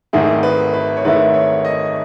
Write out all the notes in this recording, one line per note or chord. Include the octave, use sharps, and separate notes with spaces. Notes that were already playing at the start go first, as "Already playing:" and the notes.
G#1 G#2 D#3 A3 E4 G#4
B4
B4
C#5
G#1 G#2 D#3 A3 E4 B4
C#5
D#5